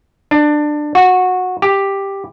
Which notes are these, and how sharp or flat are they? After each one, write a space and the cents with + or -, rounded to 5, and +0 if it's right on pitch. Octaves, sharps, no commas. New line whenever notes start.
D4 +20
F#4 -15
G4 +5